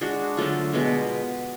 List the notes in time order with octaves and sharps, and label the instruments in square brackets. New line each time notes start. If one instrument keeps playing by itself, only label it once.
[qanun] G#3 D4 F#4
D3 F#3 A3 F4
B2 G#3 B3